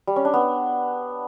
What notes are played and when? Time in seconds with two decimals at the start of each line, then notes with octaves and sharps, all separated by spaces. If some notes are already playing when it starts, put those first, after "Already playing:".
0.07 G3
0.16 C#4
0.25 D4
0.34 B3